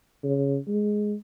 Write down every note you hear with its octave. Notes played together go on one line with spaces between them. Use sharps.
C#3
G#3